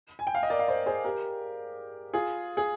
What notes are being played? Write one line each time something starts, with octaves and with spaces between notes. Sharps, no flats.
G#5
G5
F5
D#5
A#4 D5
F5
C5 D#5
G#4 C5
G4 A#4
F4 G#4
G#4